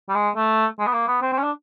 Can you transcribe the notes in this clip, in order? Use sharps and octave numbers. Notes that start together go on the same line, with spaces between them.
G3
G#3
A3
G#3
B3
A#3
B3
C4
C4
C#4
D4